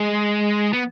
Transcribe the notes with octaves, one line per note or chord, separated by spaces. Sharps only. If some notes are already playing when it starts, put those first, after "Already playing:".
Already playing: G#3
B3